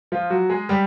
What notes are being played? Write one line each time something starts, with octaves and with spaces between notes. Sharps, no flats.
F3 F4
F#3 F#4
G#3 G#4
G3 G4